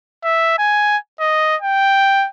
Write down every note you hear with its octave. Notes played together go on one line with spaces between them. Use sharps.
E5
G#5
D#5
G5